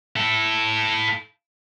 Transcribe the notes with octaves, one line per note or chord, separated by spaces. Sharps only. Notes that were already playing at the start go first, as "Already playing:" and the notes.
E4 A4